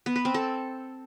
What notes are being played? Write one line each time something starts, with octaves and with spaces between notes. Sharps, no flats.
B3
B4
C4
A4